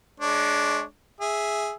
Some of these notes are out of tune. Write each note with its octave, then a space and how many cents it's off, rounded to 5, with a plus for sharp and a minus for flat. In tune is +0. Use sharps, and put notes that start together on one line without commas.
G#3 +30 D4 +0 C#5 +0
G#4 +0 E5 +0